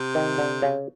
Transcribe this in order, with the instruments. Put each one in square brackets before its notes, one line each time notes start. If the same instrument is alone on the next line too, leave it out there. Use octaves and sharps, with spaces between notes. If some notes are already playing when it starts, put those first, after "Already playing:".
Already playing: [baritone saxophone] C3
[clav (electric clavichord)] D#3
D3
C#3